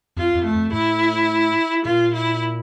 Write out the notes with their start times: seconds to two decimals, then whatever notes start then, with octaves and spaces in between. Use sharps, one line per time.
0.16 F2 F4
0.35 F2
0.45 A3
0.55 F2
0.73 A2 E4
1.85 A#2 F4
2.14 E4